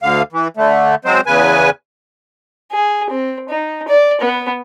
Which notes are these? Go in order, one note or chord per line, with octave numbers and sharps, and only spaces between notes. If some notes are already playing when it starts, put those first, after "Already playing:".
D2 D3 F5
E3
D3 A3
F#3 G#3 C4 C5
E2 C#3 B4 G#5
G#4
C4
D#4
D5
B3